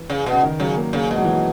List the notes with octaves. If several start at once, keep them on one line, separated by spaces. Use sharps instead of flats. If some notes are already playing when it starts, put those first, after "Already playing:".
Already playing: E3
C#3
B2
C#3
D#3
C#3 F#3
A#3
C#3 A#3
B2 G#3
F#3
E3
F#3